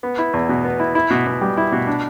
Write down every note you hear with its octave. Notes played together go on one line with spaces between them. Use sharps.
B3
E4
E2
B2
B3
E4
E4
B2
B2
G3
E4
B2
D4